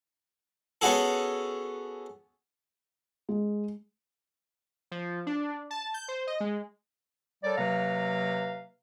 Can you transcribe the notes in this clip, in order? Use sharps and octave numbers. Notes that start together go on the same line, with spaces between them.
B3 C#4 F#4 G#4 A4
G#3
F3
D4
A5
G6
C5
D#5
G#3
G3 A4 A#4 C#5 D5
C3 F#3 A#3 B4 F5 A#5